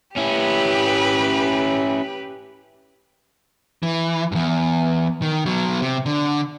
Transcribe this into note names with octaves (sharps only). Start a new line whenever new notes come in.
C#4 E4 G4 B4
E3
E2 G2
D#3
B2 F#3
C3
D3